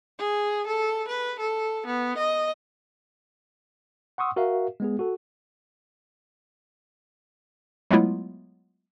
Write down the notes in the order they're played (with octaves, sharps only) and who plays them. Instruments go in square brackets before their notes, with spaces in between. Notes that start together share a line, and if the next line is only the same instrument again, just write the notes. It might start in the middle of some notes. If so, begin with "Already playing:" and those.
[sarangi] G#4
A4
B4
A4
B3
D#5
[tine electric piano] F#5 C6 C#6 D#6 E6
F#4 A#4 E5 F5
G#3 B3 G#4
F#4 A4
[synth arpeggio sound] F#3 G#3 A3 B3 E4 F4